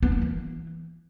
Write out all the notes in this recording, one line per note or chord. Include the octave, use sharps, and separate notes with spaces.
B3
A#3
E3